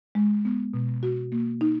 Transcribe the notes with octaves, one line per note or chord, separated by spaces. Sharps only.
G#3
B3
B2
F#4
A#3
D#4